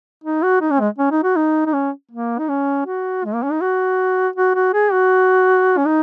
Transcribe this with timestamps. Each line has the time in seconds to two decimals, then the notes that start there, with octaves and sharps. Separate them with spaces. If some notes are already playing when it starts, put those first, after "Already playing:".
0.24 D#4
0.43 F#4
0.61 D#4
0.71 C#4
0.80 G#3
0.98 C#4
1.11 D#4
1.23 F#4
1.36 D#4
1.66 D#4
1.73 C#4
2.11 A#3
2.39 D#4
2.49 C#4
2.86 F#4
3.25 G#3
3.34 A#3
3.43 C#4
3.52 D#4
3.61 F#4
4.36 F#4
4.55 F#4
4.74 G#4
4.92 F#4
5.77 C#4
5.86 D#4